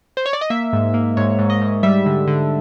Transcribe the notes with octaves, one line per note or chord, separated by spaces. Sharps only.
C5
C#5
D5
D#5
A#3 E5
G#2
A#3
G#2 C#5
G#2
D#5
G#2
G3 E5
D3
D3